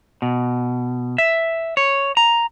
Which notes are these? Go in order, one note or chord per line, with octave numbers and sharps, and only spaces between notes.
B2
E5
C#5
A#5